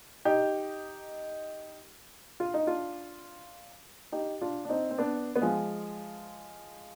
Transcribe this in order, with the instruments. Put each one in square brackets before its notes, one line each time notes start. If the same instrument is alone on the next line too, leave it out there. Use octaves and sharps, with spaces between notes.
[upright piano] D#4 G4
F4
D#4
D4 F4
D#4 G4
D4 F4
D4
C4 D#4
C4
B3 D4
B3
F3 G#3